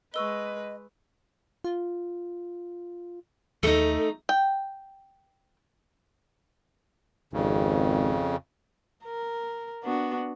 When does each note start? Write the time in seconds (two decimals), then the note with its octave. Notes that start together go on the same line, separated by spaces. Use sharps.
0.14 G#3 B4 D#5 C#6 E6 G7
1.64 F4
3.63 D#2 A3 D#4 A4
4.29 G5
7.33 G#1 F2 C#3
9.05 A#4
9.84 B3 D4 F#4